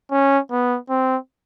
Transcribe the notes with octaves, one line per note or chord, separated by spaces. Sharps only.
C#4
B3
C4